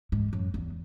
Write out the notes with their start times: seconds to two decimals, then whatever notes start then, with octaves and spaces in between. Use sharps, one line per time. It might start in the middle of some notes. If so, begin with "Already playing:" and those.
0.12 G#2
0.33 F#2
0.54 E2